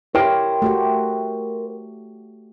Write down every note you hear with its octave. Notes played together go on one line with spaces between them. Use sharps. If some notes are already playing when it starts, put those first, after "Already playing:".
E4 G4 A#4 C5 C#5 G5
A3 F#4 G4